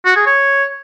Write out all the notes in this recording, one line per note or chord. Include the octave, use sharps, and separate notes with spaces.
F#4
G#4
C#5